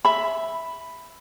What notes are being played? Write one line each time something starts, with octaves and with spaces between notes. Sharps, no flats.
E5 B5